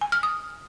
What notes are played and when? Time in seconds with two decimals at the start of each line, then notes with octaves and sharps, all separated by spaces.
0.01 G#5
0.12 F6
0.23 D#6